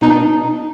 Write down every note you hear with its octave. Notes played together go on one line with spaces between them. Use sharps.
B2 D#4
D4
D#4